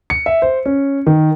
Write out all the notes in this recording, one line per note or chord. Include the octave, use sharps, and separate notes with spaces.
C#7
E5
C5
C#4
D#3